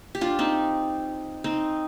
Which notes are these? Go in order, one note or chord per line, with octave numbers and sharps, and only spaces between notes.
G4
D4 F4
C4 D#4
C4 D#4